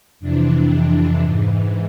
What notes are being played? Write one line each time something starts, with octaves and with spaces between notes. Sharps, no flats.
F2 C3 E3 D4
E3
G#2